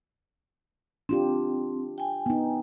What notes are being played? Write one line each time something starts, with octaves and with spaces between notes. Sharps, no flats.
C4 D4 F4 G4
G5 G#5
B3 D#4